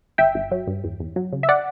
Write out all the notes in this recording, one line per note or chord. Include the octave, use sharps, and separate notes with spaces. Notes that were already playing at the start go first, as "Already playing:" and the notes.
G1 E5 G5
G1
F#3
G2
E2
E2
F#3
C#3
E5
D5 F#5